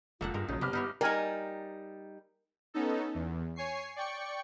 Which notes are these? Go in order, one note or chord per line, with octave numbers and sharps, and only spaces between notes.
F1 C#2 A#3 F4 A4 F#5
G2 G#3 A#4
A#1 C#3 F3 F#3 D#4 C#5
G1 C3 B3 G4 D6 F6
B3 D#4 E4 C#5
G3 D#4 A#4 G#5
B3 C#4 D#4 A4
E2
C#5 G#5 C#6 C7
D5 G5 C#6 C#7